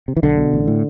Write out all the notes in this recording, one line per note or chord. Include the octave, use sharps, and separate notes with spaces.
C3
E3
B1 D3
B2
A1
A2